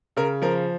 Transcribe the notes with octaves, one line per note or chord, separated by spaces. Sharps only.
C#3 A#4
F3 A#4